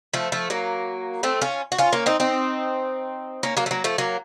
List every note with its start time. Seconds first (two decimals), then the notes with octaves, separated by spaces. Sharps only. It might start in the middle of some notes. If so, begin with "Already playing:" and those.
0.14 F3 A3
0.32 F3 A3
0.50 F#3 A#3
1.23 A3 C4
1.42 C#4 F4
1.72 F#4
1.78 C#4 F4
1.93 A#3 C#4
2.06 C4 D#4
2.20 C4 D#4
3.43 A#3 C#4
3.57 F#3 A#3
3.66 A3
3.71 F#3 A#3
3.84 F3 A3
3.98 F#3 A#3